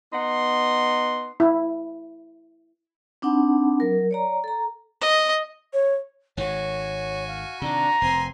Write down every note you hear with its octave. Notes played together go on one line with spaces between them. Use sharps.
B3 D#4 F#5 C6
E4
C4 D4 D#4 F#5 A5 B5
F#3 A#4
C#5 D5 A#5
A4 A#5
D#5
C#5
G#1 D#3 F#4 C#5 G#5
F5
C3 D#3 D4 A#5
F1 C4 G#5 C6